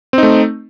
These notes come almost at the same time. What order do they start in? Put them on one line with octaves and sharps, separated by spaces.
C4 D#4 A3